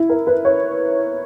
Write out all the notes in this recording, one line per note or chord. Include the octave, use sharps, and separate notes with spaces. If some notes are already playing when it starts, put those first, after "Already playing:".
Already playing: E4
A#4
B4
C#5